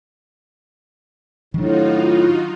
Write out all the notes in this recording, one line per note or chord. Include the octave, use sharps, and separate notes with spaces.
A2 D#3 F#3 D4 D#4 F4 F#4